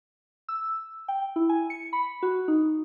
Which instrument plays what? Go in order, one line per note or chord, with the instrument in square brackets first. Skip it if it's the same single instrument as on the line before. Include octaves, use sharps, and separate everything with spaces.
[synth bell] E6
G5
E4
G#5
C#7
B5
F#4
D#4